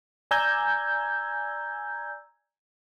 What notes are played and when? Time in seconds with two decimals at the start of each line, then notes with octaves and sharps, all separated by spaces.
0.31 D5 G#5 A#5 E6 G6 G#6